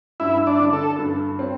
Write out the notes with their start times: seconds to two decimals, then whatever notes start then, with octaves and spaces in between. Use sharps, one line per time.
0.20 G2 E4
0.47 D4
0.60 D3
0.73 A4
0.99 G2
1.39 C4